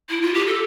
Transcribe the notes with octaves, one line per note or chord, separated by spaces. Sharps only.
E4
F4
G4
A4